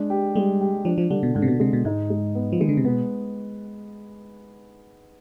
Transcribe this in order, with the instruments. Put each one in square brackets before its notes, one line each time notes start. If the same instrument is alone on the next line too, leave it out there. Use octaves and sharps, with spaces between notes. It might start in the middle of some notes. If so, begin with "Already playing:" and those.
Already playing: [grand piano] G#3 D4
G4
[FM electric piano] G3 [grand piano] G#3
[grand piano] G4
[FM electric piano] F3 [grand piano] D4
[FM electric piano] F3
[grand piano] D3 [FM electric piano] G3
[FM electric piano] B2
[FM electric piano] G#2 [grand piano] D3
[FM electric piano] C3
B2
[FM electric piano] C3 [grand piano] G#3
[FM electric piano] B2
[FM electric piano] G#2 [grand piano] D#4
[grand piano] G#3
B3
[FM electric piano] F3
[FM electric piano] D#3 [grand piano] G#3
[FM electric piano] D3
C3
[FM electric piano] B2 [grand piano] B3